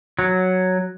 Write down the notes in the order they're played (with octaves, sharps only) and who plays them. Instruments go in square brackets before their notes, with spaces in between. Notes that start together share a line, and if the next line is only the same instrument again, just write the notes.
[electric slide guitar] F#3